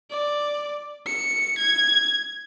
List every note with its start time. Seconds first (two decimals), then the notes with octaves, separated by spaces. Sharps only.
0.11 D5
1.07 C#7
1.58 G#6